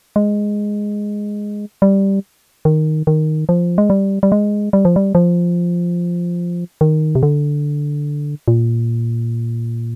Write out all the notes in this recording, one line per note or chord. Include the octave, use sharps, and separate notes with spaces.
G#3
G3
D#3
D#3
F3
G#3
G3
G3
G#3
G3
F3
G3
F3
D#3
C3
D3
A#2